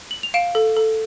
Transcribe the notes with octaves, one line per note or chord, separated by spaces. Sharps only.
F#7
F7
F5 D7 E7
A4
A4